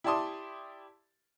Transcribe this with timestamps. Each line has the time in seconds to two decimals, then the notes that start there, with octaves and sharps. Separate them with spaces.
0.04 E4 G4 D5 A5 C6 D#6